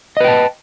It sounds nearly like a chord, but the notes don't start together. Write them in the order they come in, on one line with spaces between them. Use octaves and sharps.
D#5 B4 G5 A5